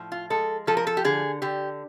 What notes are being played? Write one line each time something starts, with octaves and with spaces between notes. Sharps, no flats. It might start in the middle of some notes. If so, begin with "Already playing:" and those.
Already playing: A2 F3
F4
G#3 A4
F3 A4
A#4
A4
G4
D3 G#4
D3 G4